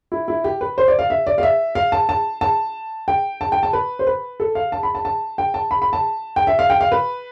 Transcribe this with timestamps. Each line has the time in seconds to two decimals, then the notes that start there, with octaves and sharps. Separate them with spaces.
0.12 E4
0.28 E4
0.44 G4
0.61 B4
0.78 C5
0.88 D5
0.99 F5
1.10 E5
1.27 D5
1.38 F5
1.43 E5
1.75 F5
1.92 A5
2.09 A5
2.41 A5
3.08 G5
3.41 A5
3.52 G5
3.63 A5
3.73 B4
3.99 C5
4.07 B4
4.40 A4
4.55 F5
4.72 A5
4.83 B5
4.95 A5
5.05 A5
5.38 G5
5.54 A5
5.71 B5
5.82 B5
5.93 A5
6.36 G5
6.47 E5
6.59 F5
6.70 G5
6.81 F5
6.92 B4